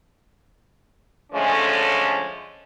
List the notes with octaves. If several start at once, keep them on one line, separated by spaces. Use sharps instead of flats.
D3 F3 G#3 A3 C#4